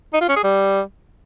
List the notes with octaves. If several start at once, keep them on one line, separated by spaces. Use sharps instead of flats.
D#4
F4
C#4
G#4
G3